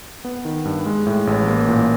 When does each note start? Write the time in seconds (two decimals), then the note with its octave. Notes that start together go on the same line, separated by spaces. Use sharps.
0.25 B3
0.45 D#3
0.65 G2
0.86 G#3
1.07 A2
1.27 A1
1.48 A#3
1.69 A#2